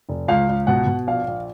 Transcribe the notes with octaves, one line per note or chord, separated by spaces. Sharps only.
F1
C#2 F5
C#2
B2 F#5
B2
A#1 F5
A#1